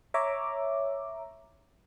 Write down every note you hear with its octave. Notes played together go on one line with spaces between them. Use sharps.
C#5 E5 A#5 D6